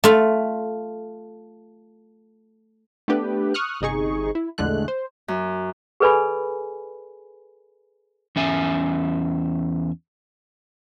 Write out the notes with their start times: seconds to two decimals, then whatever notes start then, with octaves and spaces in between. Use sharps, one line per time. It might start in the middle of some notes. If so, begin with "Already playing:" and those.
0.04 A3 F4
3.08 A3 B3 D4 G4 B4
3.54 C#6 D#6 F6 F#6
3.81 G1 C3 D#4 G#4 C#6
4.35 E4
4.58 A#1 E2 D3 G#3 A3 F#6
4.88 C5
5.28 F#2
6.00 G#4 A4 B4 D5 G#5 B5
8.36 E2 C#4 E5 G#5